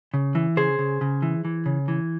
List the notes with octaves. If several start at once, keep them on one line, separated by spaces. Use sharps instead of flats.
C#3
E3
C#3 G#4 C5
C#3
C#3
E3
E3
C#3
E3